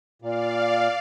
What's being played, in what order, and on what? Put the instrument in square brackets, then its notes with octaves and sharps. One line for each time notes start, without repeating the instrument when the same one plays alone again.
[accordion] A#2 [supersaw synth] D5 F5